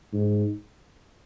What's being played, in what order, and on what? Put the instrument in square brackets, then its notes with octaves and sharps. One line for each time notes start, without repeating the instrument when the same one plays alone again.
[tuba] G#2